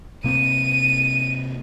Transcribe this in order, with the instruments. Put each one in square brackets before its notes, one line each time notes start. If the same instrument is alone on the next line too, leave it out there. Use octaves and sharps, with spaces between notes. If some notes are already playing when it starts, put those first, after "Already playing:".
[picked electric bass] C3 A#3 C4 [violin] D#7